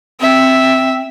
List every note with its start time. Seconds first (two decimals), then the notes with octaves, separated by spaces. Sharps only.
0.21 C4 E5